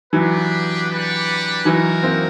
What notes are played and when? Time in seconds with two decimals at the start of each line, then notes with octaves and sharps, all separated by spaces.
0.13 E3 F#3 B3 D4 G4 B4
0.88 D4 G4 B4 D5 F#5
1.65 E3 F#3 D#4 F#4 A#4
2.03 A#3 C4